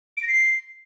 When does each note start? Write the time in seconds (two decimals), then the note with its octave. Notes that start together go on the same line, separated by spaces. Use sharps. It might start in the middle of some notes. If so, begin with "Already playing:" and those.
0.17 D7
0.23 A#6
0.28 C7